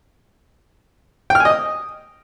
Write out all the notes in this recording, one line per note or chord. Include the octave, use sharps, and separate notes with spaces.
G5
F6
G#5
D#5
D#6